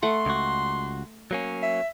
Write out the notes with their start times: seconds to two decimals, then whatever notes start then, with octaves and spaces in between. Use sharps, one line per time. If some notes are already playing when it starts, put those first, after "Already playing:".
0.03 A3 F#5 C6
0.26 C#2 F#4
1.31 F#3 A#3 C#4
1.63 E5